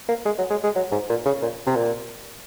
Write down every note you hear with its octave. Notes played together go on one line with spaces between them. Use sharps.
A#3
G#3
F#3
G#3
G#3
F#3
G#2
A#2
C#3
A#2
C3
A#2